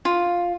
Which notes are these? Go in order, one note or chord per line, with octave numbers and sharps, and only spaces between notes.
F4